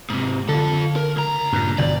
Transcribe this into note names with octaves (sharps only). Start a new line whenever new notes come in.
G#2 C3
D3 F4 A4
A#4
C#2 A#5
G2 A#2
G1 B2 E3 D5